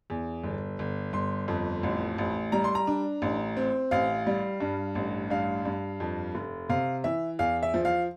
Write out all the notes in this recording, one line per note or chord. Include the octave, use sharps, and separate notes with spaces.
E2
G1
G1
G1 C6
F2
A1
A1
G3 A#5
C6
A#5
D4
A1
C4
A1 F5
G3
G2
A1
G2 F5
G2
F2
F1
C3 F5
E3 E5
E2 F5
E5
F3
F5